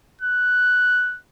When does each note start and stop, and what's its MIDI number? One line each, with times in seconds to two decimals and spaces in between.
0.21 1.18 90